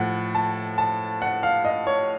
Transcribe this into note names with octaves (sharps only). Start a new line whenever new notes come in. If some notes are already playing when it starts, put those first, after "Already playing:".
Already playing: A2 F3 F#5
A5
A5
F#5
F5
D#5
C#5